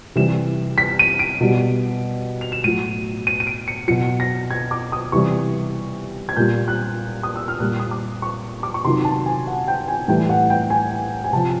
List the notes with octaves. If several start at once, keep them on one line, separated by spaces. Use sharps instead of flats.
C3 E3 G3 E7
B6
D#7
D7
B2 G3
F7
E7
A2 F#3 D#7
D#7
D#7
D7
C#7
B2 F#3 C#7
A#6
G#6
D6
D#6
C3 E3 G3 C#6
G#6
A#2 G3 G6
F#6
D#6
E6
F6
A#2 G3 F#6
D#6
D6
C#6
D6
C#6
C3 D#3 F#3 C6
A5
G#5
F#5
G5
G#5
A2 E3 G3 G5
F#5
G5
G#5
G#5
C3 F3 A5